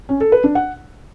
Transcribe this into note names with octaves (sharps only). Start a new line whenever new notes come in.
C#4
A4
B4
D4
F#5